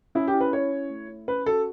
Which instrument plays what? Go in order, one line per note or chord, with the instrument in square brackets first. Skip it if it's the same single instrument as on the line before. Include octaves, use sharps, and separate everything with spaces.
[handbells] C#4 [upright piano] E4
[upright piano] G4
[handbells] E4
[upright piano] B4
[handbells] C#4 [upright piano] C#5
[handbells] E4
A3
E4
[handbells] C#4 [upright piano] B4
[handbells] F#4 [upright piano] A4